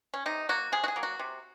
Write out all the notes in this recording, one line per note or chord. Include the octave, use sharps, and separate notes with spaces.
C#4
C3 D#4
F#3 A#3 F#4
C3 G#4
F#4
G#4
F#3 A#3
F#4
C3